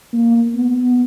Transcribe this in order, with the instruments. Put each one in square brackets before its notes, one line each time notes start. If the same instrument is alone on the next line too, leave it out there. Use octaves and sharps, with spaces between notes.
[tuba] A#3
B3